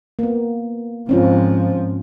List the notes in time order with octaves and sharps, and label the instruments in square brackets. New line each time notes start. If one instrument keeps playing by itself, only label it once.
[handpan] A#3 B3
[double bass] G#2 F3 [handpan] C4 C#4 F4